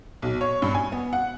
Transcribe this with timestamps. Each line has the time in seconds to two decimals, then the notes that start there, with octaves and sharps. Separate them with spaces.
0.22 B1
0.41 C#5
0.62 G2
0.75 G#5
0.92 B3
1.13 F#5